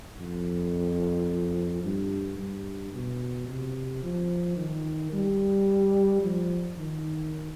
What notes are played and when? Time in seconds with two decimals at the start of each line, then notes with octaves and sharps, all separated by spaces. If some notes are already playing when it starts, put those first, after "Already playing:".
0.19 F2
1.84 G2
2.38 G2
2.94 B2
3.48 C3
4.03 F3
4.57 D#3
5.12 G3
6.22 F3
6.77 D#3